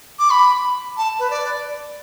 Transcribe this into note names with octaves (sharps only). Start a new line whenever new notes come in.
D6
B5
A5
B4
D5